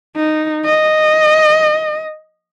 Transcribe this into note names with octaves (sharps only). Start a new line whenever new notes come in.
D#4
D#5